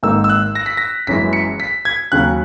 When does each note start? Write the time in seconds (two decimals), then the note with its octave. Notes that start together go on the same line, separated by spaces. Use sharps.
0.03 G#1 G#2 D#3 A#3 D#4 E6
0.24 E6
0.29 F#6
0.55 A#6
0.66 B6
0.77 A#6
1.07 F#1 F#2 E3 G#3 B6
1.33 C#7
1.60 B6
1.85 G#6
2.12 D#2 C#3 F#3 C#4 F#6